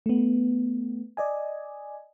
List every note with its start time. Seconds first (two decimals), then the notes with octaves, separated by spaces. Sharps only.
0.06 A3 B3
1.17 D5 D#5 G#5